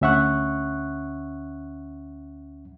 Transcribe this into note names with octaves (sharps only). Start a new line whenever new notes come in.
D2 C#4 E5 F#5 C#6 F#6